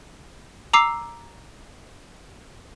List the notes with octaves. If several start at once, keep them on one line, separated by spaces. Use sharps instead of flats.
A#5 D6 E6 C7